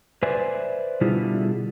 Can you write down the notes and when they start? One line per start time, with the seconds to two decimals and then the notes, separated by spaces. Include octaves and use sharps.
0.23 B4 C5 D5 E5 G#5
1.01 B2 D3 G3 E4 F4 G#4